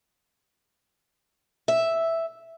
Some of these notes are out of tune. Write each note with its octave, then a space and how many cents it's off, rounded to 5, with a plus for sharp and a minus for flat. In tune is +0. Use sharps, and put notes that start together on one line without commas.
E5 +0